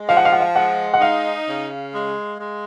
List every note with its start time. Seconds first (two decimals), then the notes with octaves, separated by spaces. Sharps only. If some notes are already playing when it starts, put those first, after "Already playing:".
Already playing: G#3
0.09 F3 F5
0.17 F#5
0.25 F5
0.32 F#5
0.40 F5
0.55 G#3 F#5
0.94 F#5
1.01 D#4 F5
1.47 C#3
1.94 G#3
2.40 G#3